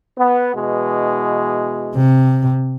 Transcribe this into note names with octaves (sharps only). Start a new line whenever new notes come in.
B3
B2 E3 G#3
C3